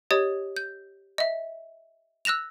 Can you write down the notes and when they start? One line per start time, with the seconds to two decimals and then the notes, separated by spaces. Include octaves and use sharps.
0.11 G4 C#5 D#5 D#6 G#6 A6
0.57 G6
1.18 D#5 E5
2.25 E6 F#6 A#6 E7 F7